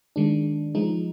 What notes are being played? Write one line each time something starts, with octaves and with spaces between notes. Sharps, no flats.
D#3 G#3 D4
F3 G#3 D#4